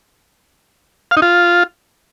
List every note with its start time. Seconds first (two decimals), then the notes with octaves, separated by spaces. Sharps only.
1.11 F5
1.17 D#4
1.22 F4